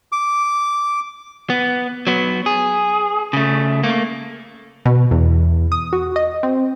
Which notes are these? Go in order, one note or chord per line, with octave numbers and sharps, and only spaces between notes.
D6
B3
F#3 B3
G#4
C#3 A3
A3 A#3
B2
E2
D#6
F#4
D#5
C4